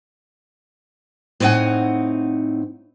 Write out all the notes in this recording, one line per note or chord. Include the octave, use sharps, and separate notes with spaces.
A2 C4 D#4 B4 F#5 G#5